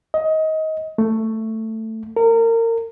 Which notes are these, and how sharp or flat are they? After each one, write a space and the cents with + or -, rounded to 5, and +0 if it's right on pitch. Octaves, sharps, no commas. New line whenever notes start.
D#5 +20
A3 +10
A#4 -30